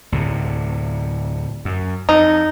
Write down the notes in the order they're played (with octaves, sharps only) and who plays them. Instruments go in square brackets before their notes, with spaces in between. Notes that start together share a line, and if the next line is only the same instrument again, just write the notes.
[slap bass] D2 A2 C3
F#2
[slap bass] F2 [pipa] D#4